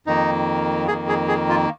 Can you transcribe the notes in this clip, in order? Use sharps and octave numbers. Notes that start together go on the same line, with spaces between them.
F2 D#3 A#3 D#4
F2 D#3 A#3 G#4
G#4
G#4
F4